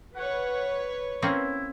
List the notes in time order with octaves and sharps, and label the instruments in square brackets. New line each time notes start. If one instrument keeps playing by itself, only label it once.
[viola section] B4 C#5 [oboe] F#5
[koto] A#3 C4 C#4 [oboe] E4